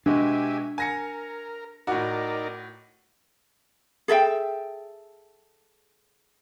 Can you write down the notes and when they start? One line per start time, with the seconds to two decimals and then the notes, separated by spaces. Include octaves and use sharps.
0.06 B2 G#3 D4 G4 E5 G#5
0.78 A#4 G#5 A#6 C#7
1.87 A2 D#4 F#4 A#4 D5
4.08 G#4 A4 E5 G5